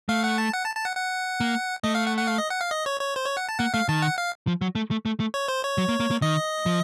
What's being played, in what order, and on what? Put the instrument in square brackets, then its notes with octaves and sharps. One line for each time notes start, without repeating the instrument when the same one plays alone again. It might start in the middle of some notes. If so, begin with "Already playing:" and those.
[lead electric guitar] A3 [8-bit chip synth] F5
[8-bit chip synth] F#5
A5
F#5
A5
A5
F#5
F#5
[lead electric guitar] A#3
[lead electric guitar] A3 [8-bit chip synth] D#5
[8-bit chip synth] F5
F#5
F#5
F5
D#5
F#5
F5
D#5
C#5
C#5
C5
C#5
F#5
A5
[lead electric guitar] A#3 [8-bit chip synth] F#5
[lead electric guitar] A3 [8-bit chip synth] F5
[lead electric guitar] D#3 [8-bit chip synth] A5
[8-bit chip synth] F#5
F5
[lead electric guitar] F3
F#3
A3
A3
A3
A3
[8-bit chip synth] C#5
C5
C#5
[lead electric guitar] F#3
A#3
A#3
A#3
[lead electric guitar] D#3 [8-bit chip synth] D#5
[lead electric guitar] F3